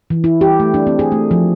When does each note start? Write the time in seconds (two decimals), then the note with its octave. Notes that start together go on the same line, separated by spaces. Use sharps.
0.10 E3
0.24 E4
0.41 G4
0.60 A3
0.74 D4
0.87 C4
0.99 G#4
1.12 A3
1.31 F3